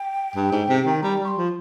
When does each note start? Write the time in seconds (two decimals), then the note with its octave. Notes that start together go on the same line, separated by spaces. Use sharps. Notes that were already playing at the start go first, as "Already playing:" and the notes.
Already playing: G5
0.35 G2
0.52 G#2
0.69 C3
0.86 D#3
1.03 G3 A#5
1.20 G3 C#6
1.28 C6
1.37 F3